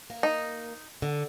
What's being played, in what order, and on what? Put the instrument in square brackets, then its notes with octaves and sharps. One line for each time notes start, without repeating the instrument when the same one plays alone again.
[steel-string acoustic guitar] A#3
[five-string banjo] D#4
[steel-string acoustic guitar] D3